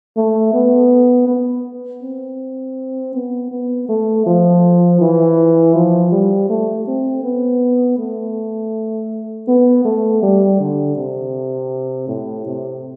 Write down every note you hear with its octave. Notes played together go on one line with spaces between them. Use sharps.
A3
B3
B3
C4
B3
B3
A3
F3
E3
F3
G3
A3
C4
B3
A3
B3
A3
G3
D3
C3
A2
C3